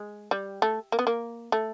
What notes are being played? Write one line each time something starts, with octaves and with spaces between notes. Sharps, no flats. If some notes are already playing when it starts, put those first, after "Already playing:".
Already playing: G#3
G3
A3
A#3
B3
A#3
A3